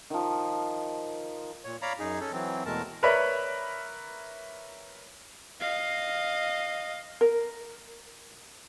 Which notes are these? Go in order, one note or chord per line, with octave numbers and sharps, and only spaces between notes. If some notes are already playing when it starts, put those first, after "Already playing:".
D#3 F3
A#2 C#5
C#5 D5 F5 A#5 B5
F#2 D#4 G#4
C#4 A4
E3 F#3 C4
E2 B2 G#3 A3 A#4 A5
A#4 B4 C#5 D5 E5 B5
D#5 F5
A#4